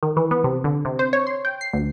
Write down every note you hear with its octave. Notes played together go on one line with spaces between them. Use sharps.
D#3
E3
B3
C3
D3
C3
C5
C#5
C6
G5
C7
D2